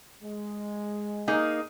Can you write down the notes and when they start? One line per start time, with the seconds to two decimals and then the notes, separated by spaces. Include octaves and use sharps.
0.23 G#3
1.28 A#3 D#4 G#4